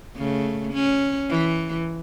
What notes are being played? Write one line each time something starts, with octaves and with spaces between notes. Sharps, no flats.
C#3 A3
C#4
E3